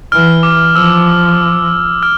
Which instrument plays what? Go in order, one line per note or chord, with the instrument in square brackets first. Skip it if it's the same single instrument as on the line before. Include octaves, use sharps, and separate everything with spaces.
[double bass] E3 [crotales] F6
[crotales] D6
[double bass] F3 [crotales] E6
[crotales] F6